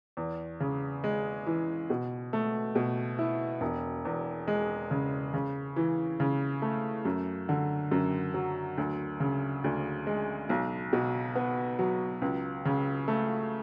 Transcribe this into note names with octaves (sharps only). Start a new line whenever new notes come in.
E2
C#3
G#3
E3
B2
A3
B2
E4
E1
E2
G#3
C#3
C#3
E3
C#3
A3
F#2
D3
F#2
F#3
D2
C#3
D2
G#3
B1
B2
B3
F#3
C#2
C#3
A3